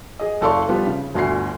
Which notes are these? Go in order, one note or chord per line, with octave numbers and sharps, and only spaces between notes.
G#4 D#5
F#1 A4 D5 F5 C6 C#6
F3 G3 B3 F4
C#3
G1 D2 F#4 G#5 C7